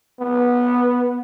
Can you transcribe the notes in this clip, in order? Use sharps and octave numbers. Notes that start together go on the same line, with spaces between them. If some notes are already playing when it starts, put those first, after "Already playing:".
B3